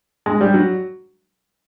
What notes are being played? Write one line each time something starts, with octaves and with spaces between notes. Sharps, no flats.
G#3
G3
F#3